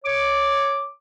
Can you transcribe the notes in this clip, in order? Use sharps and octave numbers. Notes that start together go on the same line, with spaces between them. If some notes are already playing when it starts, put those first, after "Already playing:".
C#5 D6